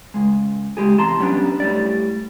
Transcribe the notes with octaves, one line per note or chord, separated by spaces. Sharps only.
C#2 G#3
C#2 G#3 G4 G#4
E2 C3 A5 A#5 C6
F#3 G3 B3 C#4 D4
A2 G3 D5